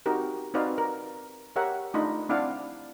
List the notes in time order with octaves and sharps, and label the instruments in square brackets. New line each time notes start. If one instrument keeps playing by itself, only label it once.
[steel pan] C4 D#4 F#4 G4 A#4
C4 D#4 F#4 B4 D5 F5
A#4
G4 A#4 C#5 E5 F#5
A3 D4 D#4 F4 B5
C4 D4 E4 D5 F5 F#5